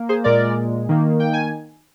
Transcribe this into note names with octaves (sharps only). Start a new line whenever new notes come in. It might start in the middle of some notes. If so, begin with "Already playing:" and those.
Already playing: A#3
G#4 C5
A#2 G#3 A#4 D5
D#3 A#3
G5
G#5